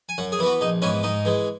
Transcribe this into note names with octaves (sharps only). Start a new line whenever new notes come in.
G#5
F#2 F#5
G#4
E3 B3 E4 F#4
A#1 D#4
G#2 E3 B3 C#4
G#2 D#4
E3 G#3